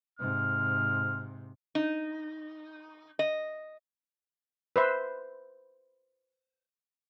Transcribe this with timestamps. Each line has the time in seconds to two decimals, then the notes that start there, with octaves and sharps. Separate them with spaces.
0.19 G#2 C3 F6
1.75 D#4
3.19 D#5
4.76 B4 C5 E5